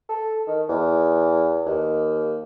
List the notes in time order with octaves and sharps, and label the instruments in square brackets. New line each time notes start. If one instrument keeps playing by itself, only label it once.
[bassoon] A4
D#3
E2
D#2